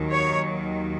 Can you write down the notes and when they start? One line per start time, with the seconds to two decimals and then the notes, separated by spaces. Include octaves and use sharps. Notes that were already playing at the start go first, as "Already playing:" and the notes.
Already playing: D#2 D#3 F#3
0.12 C#5